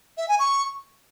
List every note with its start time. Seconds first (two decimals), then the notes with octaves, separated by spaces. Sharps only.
0.17 E5
0.28 G#5
0.39 C#6